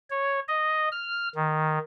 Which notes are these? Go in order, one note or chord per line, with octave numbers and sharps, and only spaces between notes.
C#5
D#5
F6
D#3